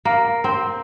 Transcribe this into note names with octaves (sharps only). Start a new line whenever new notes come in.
A#3
C4